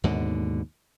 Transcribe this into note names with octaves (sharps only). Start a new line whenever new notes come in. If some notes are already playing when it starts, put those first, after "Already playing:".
D#2 G#2 B2 D3